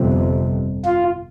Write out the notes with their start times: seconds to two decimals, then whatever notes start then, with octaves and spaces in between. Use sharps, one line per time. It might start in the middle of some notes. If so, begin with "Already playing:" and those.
Already playing: G1 F2 C3
0.85 F4